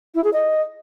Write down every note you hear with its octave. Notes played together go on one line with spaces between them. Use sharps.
E4
G#4
D#5